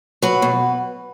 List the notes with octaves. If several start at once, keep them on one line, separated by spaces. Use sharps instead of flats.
F#3 B4
B2